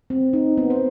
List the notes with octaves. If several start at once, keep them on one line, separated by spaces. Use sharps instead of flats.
C4
D#4
B3
C5